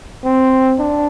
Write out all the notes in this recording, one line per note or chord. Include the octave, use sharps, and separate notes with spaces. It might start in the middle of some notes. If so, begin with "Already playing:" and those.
C4
D4